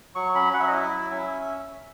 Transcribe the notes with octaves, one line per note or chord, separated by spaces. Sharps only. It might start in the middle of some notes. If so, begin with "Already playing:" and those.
F#3 C#6
C#4 B5
F#3 F#5
E5
D#5
E4 E5
F#3
C#4